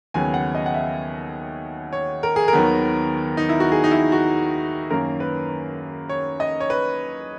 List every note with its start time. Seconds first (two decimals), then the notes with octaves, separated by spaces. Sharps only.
0.14 D#2 C#3 F#3 B3 G#5
0.34 F#5
0.55 D#5
0.66 F#5
0.74 E5
1.93 C#5
2.23 A#4
2.36 G#4
2.48 A#4
2.53 D#2 D#3 F#3 B3
3.37 D#4
3.49 E4
3.60 F#4
3.72 G#4
3.84 D#4
3.91 E4
4.12 F#4
4.90 F#2 D#3 A#3 C#4 A#4
5.20 B4
6.09 C#5
6.40 D#5
6.60 C#5
6.70 B4